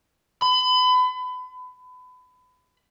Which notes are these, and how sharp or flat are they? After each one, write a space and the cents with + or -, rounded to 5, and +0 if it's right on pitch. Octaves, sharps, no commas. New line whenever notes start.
B5 +30